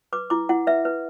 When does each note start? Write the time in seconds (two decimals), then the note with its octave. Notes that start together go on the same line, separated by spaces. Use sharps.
0.13 B4 D6
0.30 E4 D6
0.49 E4 F#5
0.67 B4 E5
0.85 B4